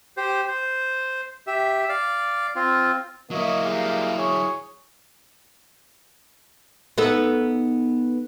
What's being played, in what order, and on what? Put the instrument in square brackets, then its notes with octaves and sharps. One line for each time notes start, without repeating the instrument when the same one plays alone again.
[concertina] G4 C5
C5
G4 E5
D5 F5
C4 F4
[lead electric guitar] F#3 E4 [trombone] A#3 [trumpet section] C#5 D#5
[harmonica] G3 G#3 [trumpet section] F5
[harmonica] G#4 [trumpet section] C#5
[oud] B3 D#4 A4